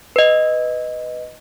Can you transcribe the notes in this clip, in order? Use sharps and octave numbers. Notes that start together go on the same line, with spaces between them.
B4 D#5